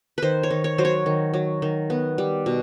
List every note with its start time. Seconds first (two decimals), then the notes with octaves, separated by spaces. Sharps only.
0.18 D#3 B4 C5
0.43 C#5
0.50 D#3
0.64 C#5
0.78 F#3 C5
0.85 C#5
1.06 D#3
1.34 F#3
1.62 D#3
1.90 B3
2.18 G3
2.46 B2